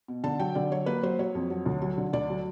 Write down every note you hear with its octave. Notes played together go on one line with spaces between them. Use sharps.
B2
D3 A5
F#3 G5
D3 D5
F#3 C#5
A#3 B4
F#3 C5
F#3 C#5
F2
F#3
D2
F#3
D3
D2 D5
F#3